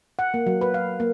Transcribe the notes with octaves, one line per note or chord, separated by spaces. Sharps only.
F#5
A#3
F#3
B4
F5
A#3